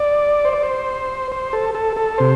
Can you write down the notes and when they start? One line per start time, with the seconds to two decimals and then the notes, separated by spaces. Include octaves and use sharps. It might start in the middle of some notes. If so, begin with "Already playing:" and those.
Already playing: D5
0.45 C5
0.53 D5
0.63 C5
1.32 C5
1.53 A4
1.75 A4
1.96 A4
2.18 C3 C5